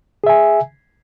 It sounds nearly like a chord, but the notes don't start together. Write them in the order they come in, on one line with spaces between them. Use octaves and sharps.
G#4 E5 G#5